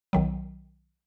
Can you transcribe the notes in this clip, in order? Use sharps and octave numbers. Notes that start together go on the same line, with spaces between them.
B1 D#3 F#3